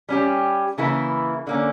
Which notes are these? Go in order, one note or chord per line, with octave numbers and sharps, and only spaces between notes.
G3 C#4 G4
C#3 E3 A#3 E4
D3 A#3 C#4